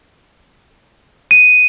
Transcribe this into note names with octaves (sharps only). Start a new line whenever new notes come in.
D#7